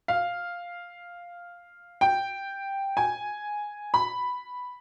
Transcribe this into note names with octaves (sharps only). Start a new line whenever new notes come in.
F5
G5
G#5
B5